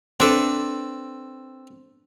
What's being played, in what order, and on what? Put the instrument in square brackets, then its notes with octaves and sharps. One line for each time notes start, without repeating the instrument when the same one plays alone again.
[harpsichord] C4 A4 B4 [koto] D4 E5